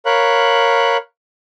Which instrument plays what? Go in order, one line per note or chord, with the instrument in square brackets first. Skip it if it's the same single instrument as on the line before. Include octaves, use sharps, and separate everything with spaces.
[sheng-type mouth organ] A#4 C#5 F5 B5 F#6